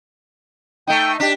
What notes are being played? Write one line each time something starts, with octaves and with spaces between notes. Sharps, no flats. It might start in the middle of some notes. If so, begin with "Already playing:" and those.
A3 D#4 G5
D4 G4 B6